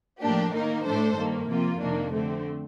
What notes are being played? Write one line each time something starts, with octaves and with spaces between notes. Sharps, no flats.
A2 F3 A#3 D4 G4
D#3 A#3 D#4 A#4
A2 A3 D4 A4 C5
G2 D#3 A#3
C3 F3 A#3 F4
F2 C3 D#3 A#3 D4
D3 A3 C4